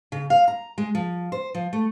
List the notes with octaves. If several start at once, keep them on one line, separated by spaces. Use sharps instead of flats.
C#3
F5
A#5
G#3
F3
C5
F3
A3